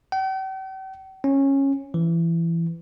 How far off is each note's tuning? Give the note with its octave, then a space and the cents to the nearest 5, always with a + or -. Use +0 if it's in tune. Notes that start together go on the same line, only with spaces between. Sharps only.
G5 -45
C#4 -15
E3 +20